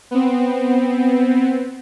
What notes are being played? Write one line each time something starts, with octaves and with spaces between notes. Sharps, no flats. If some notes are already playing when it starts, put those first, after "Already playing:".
B3 C4